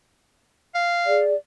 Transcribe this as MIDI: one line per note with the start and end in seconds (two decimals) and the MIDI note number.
0.75 1.20 77
1.05 1.33 68
1.05 1.33 74